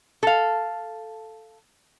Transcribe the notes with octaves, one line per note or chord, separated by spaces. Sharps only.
A4 F5